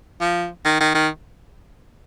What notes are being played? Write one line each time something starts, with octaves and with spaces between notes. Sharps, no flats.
F3
D#3
D#3
D#3